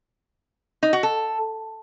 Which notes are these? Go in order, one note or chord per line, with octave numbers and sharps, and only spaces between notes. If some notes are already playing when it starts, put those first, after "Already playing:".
D#4
F#4
A4